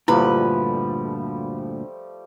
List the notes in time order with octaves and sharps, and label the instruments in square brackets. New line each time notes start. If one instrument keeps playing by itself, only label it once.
[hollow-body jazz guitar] D2 G2 A#2 [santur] F3 G3 A3 [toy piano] E4 [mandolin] B4